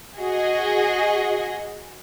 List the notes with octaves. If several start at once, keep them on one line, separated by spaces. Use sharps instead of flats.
F#4 G#4 D#5